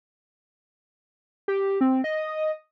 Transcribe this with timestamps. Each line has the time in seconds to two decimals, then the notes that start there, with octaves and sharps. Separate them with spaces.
1.48 G4
1.81 C4
2.04 D#5